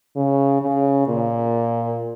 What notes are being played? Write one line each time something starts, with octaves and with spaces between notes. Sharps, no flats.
C#3
C#3
A#2